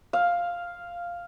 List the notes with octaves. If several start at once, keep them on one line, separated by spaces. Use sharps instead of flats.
F5